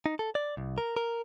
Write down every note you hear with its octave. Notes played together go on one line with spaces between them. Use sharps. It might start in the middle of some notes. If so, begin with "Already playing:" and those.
D#4
A4
D5
C2
A#4
A#4